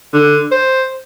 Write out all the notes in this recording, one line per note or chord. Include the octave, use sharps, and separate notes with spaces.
D3
C5